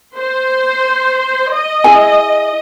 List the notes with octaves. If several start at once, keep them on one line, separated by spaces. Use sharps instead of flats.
C5
D#5
E4 G#4 G#5